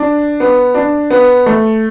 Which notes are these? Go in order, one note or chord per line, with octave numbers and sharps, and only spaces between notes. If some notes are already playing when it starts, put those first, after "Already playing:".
Already playing: D4
B3
D4
B3
A3